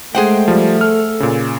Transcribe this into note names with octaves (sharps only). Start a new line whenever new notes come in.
G#3 A3 G#4 C5 F#5 G5
F3 G3
A4 F6
A#2 C#3